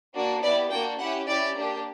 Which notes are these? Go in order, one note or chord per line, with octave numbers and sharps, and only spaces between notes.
A#3 D4 F#4
B3 E4 G4 D5
A#3 D4 F#4 G5
C#4 E4 G4 F#5
C#4 E4 G4 D5
A#3 D4 G4